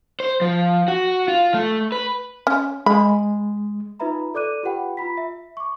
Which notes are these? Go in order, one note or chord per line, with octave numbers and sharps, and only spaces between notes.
C5
F3
F#4
F4
A3
B4
C#4
G#3 B5
D#4 F4 B4 E5 A#5 B5
A4 D5 D6 F#6 D#7
F4 G4 B4 F#5 G5 B5
F4 A#5 B5 B6
E5
C#6 D6